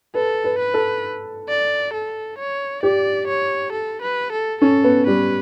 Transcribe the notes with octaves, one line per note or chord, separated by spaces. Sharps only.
A4 B4
B4
B4
A4
D5
A4
C#5
G4 D5
C#5
A4
B4
A4
C#4 A4
B3
G3 B4